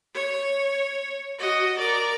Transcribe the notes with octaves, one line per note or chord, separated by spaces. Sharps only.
C#5
F#4 D#5
A#4 D5